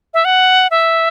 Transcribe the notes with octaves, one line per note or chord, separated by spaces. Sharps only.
E5
F#5
E5